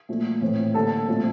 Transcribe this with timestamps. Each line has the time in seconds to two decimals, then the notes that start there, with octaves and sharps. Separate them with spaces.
0.09 A#2 F3 A3
0.41 A2 E3 A3 C4
0.74 D3 G3 A#3 A4 A5
1.07 A#2 F3 A3 C4